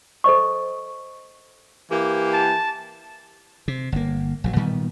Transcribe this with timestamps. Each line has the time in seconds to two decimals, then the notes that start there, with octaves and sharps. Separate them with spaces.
0.24 A4 C5 D#5 C#6
1.91 E3 A#3 G4
2.33 A5
3.68 C3
3.92 G1 A#3
4.44 A#1 C#3 F#3
4.56 A#2 D#3 G3 B3